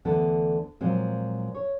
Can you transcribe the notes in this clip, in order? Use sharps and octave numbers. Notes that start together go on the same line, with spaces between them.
D2 D3 E3 B3 A4
A#2 F3 F#3 G#3 C4
C#5